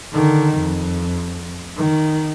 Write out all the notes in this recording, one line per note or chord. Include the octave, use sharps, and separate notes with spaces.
D3 D#3
F2
D#3